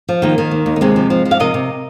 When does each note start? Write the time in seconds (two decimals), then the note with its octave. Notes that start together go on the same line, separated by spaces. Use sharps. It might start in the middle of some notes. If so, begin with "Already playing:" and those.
0.09 F3
0.22 D#3 A#3
0.38 D#3
0.51 D#2
0.66 D#2
0.76 D#4
0.81 C3 G#3 C4
0.96 F3
1.10 F3
1.25 F3
1.31 F5
1.40 C3 A#4 D#5
1.54 C3